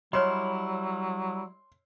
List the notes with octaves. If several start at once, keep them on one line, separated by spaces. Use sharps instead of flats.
F#3 G3 E4 C#5 D#5 C6 F6